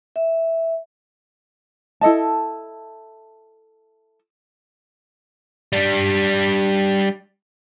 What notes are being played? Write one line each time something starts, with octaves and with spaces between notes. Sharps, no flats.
E5
E4 A4 D#5 A5
G3 D4